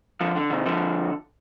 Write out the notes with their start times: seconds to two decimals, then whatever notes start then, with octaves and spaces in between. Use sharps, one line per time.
0.21 D3 F3
0.35 D3
0.50 C3 D#3
0.66 D3 F3